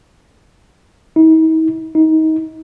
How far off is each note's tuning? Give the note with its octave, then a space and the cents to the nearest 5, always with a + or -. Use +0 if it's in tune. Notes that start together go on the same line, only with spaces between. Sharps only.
D#4 +45
D#4 +25